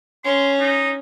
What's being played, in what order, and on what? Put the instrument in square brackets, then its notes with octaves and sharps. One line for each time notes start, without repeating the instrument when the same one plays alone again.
[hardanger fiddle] C#4 [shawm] C6
[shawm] D#4